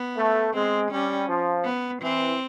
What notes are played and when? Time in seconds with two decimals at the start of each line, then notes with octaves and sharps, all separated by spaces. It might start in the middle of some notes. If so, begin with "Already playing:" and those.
Already playing: B3
0.17 A3
0.54 G#3 C4
0.91 G3 C#4
1.28 F3
1.65 B3
2.02 E3 C4